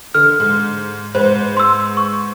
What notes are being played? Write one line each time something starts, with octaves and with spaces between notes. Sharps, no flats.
D3 F6
G#2
G#2 B4 C5
C6 E6
C#6